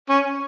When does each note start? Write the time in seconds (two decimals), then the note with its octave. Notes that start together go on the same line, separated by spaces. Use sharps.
0.09 C#4